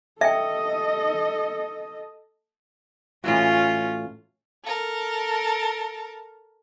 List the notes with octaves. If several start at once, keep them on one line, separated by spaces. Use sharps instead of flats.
A4 D#5 E5 G5
A2 E3 C#4 F4 F#4
A4 A#4